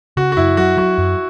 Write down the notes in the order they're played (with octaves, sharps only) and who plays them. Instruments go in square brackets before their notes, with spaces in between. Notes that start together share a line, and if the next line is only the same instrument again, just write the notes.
[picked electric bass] C#3 [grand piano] F#4
[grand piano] F#4
[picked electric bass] F#2 [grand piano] E4
[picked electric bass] F#3 [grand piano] F#4
[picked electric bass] F#3 [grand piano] F#4
[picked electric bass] F#2